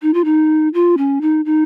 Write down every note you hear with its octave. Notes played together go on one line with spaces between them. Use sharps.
D#4
F4
D#4
F4
C#4
D#4
D#4